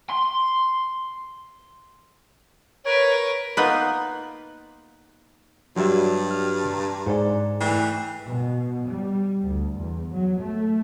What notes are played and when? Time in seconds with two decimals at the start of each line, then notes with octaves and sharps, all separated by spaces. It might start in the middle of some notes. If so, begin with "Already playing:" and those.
0.10 C6
2.85 A#4 B4 C#5
3.57 A#3 B3 D#4 F4 B4
5.76 G2 F#3 G3 F#4 E5
6.31 F6
6.73 A#5
7.06 G#2 G#4 C5 D5
7.61 E3 A3 G5 C7
8.27 B2
8.89 G3
9.42 D2
9.76 E2
10.11 F#3
10.40 A3